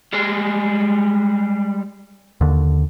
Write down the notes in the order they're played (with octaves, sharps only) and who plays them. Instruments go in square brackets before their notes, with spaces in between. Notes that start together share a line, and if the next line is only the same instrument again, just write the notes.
[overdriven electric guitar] G3 G#3
[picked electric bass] D#2 D3